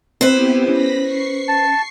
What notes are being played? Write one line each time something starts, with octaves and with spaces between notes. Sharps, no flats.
B3 C4 E4 G4 B4 C5
C#4 B5 A#6 B6
C#6 C7
A5